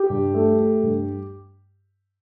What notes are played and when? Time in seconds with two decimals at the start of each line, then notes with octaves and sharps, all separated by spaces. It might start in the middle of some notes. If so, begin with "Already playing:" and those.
Already playing: G4
0.10 G2
0.34 A3
0.58 A3
0.83 G2